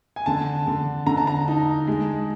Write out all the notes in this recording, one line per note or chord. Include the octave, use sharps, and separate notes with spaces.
G#5
D3 A5
D3
D3 A#5
A5
A#5
D#4
G#3